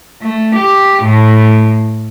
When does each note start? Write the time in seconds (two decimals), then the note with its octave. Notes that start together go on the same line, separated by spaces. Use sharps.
0.22 A3
0.55 G4
1.03 A2